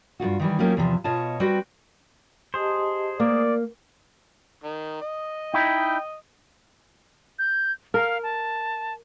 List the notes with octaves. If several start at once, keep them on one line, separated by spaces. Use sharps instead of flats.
G2 A#2 F4 F#4
D#3 E3 G3
F#3 A#3 C#4 D#4 F4 G4
E2 C3 E3 F3
B2 F4 C#5 D#5 A5
G3 C4 F#4 B4 G5
G4 G#4 C5 D#5 A5
A#3 A#4 D5
D#3
D#5
D#4 E4 G5
G6
A#4 F5
A5